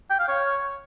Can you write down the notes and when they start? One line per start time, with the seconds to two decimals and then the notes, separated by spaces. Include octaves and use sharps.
0.10 G5
0.19 F5
0.28 C#5